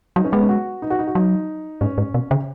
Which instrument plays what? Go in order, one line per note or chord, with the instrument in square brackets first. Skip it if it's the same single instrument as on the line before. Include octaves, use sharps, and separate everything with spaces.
[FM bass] F#3 [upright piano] D#4
[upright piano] C#4
[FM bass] G#3 [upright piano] B3
[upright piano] C#4
F#4
D#4
F#4
D#4
F#4
[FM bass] F#3 [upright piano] D#4
[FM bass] G#2 [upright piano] C#4
[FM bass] G#2
B2
C#3